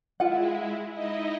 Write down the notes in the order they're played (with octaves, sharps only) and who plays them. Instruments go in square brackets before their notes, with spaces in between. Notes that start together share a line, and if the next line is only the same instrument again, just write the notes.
[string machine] G#3 E4 [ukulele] F4 F#5
[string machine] D#4 E4 D#5